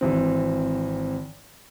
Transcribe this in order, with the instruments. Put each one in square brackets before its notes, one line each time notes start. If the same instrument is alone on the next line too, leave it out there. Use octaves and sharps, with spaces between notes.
[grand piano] G#1 E3 C4